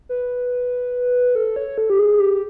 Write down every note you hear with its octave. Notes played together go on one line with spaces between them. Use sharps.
B4
A4
C#5
A4
G4
G#4
G4